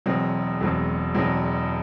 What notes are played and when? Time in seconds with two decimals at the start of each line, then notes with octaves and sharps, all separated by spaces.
0.06 E1 E2 B2 F#3 C4
0.60 E1 E2 B2 F#3 C4
1.14 E1 E2 B2 F#3 C4